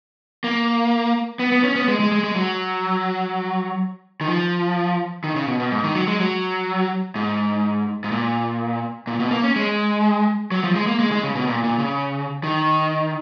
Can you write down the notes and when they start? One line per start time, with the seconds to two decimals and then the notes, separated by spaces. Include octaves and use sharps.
0.44 A#3
1.39 B3
1.52 B3
1.64 C#4
1.76 B3
1.88 G#3
2.00 G#3
2.12 G#3
2.24 G#3
2.36 F#3
4.21 D#3
4.28 F3
5.24 D#3
5.36 C#3
5.47 B2
5.60 B2
5.72 G#2
5.84 D#3
5.95 F#3
6.08 G#3
6.20 F#3
7.16 G#2
8.04 G#2
8.12 A#2
9.07 A#2
9.20 B2
9.31 A#3
9.43 C#4
9.56 G#3
10.51 F#3
10.64 F3
10.76 G#3
10.87 A#3
10.99 G#3
11.12 G#3
11.23 C#3
11.35 B2
11.47 A#2
11.64 A#2
11.79 C#3
12.44 D#3